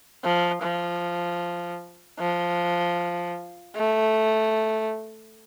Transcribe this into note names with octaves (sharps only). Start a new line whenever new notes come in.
F3
F3
F3
A3